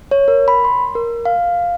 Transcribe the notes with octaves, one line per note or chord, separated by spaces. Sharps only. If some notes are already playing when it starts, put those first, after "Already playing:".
C#5
A#4
B5
C6
A#4
F5